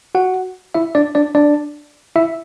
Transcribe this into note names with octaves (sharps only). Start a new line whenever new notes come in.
F#4 F#5
E4 E5
D4 D5
D4 D5
D4 D5
E4 E5